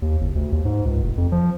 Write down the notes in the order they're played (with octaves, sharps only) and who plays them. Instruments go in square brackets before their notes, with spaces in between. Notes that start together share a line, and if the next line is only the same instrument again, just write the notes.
[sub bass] D#2
F#1
D2
D#2
G#2
C#2
F1
F2
F3